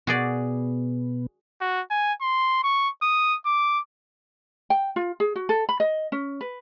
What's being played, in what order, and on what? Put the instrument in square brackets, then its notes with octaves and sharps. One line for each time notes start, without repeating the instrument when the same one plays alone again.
[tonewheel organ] B2 B3 [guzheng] F#4 G#4 D5
[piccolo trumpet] F#4
G#5
C6
C#6
D#6
D6
[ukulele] G5
F4
G#4
F#4
A4
B5
D#5
C#4
B4